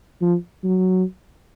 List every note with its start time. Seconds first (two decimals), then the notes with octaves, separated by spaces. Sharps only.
0.21 F3
0.64 F#3